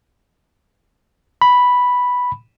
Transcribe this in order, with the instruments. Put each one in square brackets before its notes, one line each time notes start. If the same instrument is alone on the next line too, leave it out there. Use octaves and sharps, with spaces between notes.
[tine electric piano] B5